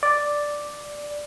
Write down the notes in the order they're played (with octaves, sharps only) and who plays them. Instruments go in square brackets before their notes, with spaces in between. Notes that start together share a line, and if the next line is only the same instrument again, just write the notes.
[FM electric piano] D5